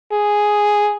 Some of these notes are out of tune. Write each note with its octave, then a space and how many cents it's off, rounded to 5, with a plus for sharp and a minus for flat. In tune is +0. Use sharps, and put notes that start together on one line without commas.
G#4 +0